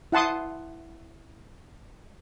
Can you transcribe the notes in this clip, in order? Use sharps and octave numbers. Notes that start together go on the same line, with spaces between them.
E4 F#5 A5 C6 D#6